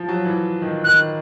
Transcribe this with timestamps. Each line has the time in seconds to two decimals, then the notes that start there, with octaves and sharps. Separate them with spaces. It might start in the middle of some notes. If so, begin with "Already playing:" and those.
Already playing: F3
0.09 F#3
0.25 E3
0.62 D#3
0.84 D#3 F#6